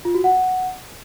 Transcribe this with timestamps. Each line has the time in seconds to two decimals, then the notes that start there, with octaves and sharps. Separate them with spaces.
0.05 F4
0.15 F#4
0.24 F#5